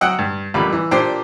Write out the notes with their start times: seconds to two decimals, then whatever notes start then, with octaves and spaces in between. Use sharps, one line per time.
0.01 F#3 D#5 F#5 G5 E6
0.19 G2
0.54 A1 F#2 A#2 G3 B5
0.72 E3
0.91 A#2 D4 G4 C5 G5